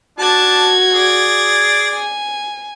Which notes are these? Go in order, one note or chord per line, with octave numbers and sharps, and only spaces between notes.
D4 F#4 A5 G#6
G#4 D5
G#5